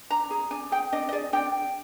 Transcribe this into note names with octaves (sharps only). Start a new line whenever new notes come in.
D4 A#5
G#4
D4 G#5
G#4 G5
D4 D#5
D#5
G#4 D5
D4 G5